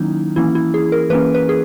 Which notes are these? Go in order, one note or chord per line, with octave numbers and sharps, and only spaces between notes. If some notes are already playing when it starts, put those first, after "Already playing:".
Already playing: D#3 F#3 A#3 C#4 D#4 E4
E3 A#3 C#4 E4
E4
G#4
A#4
E3 A#3 C#4 B4
B4
G#4